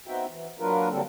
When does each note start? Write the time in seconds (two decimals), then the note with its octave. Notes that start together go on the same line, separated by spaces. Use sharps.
0.07 B3 C4 D#4 F#4 E5 G5
0.28 E3
0.60 F#3 A#3 D4 F4 A#4 B4
0.90 D3 F#3 G3 A#3 C4 A4